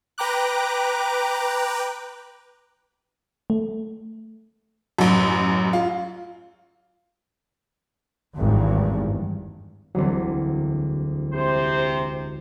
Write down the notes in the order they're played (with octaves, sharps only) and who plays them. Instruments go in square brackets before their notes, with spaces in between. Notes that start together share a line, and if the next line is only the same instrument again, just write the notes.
[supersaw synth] B4 G5 A#5 D6 F#6
[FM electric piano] A3
[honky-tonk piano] A1 F#2
F4
[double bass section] G#1 E2 G2
[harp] E1 D2 [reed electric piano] F#3 G3 C4
[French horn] C3 [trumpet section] C5